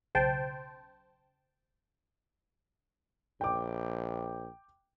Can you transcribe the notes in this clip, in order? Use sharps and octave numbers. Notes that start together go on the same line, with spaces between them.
B1 C#3 C5 G5 A5
A#1 G5 D6